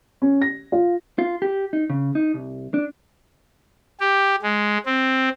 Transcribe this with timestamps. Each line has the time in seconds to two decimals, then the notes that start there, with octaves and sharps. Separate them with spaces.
0.22 C#4
0.42 A#6
0.72 F4
1.19 F4
1.42 G4
1.73 D#4
1.90 C#3
2.15 D#4
2.34 C2
2.74 D4
4.00 G4
4.42 G#3
4.86 C4